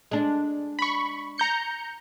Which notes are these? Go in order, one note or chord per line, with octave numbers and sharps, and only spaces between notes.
G#3 D4
B5 C#6
A#5 G6 C#7